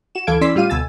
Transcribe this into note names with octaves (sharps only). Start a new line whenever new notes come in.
F#4 E7
D2 E3 A4 F5 G#6 D7
E3 C#4 D5 C6 E6 B6
A2 G3 F4 F5 D#7
D2 B2 G#5 E6 A6